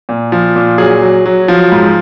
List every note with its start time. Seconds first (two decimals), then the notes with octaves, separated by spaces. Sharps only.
0.09 A#2
0.32 F3
0.56 A#2
0.78 F#3 G#4
1.02 F#3
1.26 F#3
1.48 F3
1.72 G#2